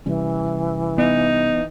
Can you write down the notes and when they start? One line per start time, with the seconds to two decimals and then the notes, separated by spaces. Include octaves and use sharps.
0.06 C3 E3 G3 C#4
0.98 B3 D#4